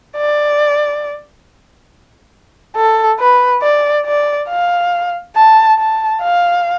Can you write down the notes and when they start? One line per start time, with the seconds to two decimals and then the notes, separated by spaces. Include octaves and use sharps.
0.16 D5
2.76 A4
3.19 B4
3.62 D5
4.06 D5
4.49 F5
5.36 A5
5.78 A5
6.22 F5